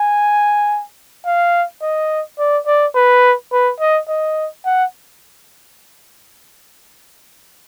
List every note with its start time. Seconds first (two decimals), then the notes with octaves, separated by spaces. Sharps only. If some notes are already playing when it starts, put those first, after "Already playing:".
Already playing: G#5
1.25 F5
1.82 D#5
2.39 D5
2.66 D5
2.95 B4
3.52 B4
3.80 D#5
4.08 D#5
4.65 F#5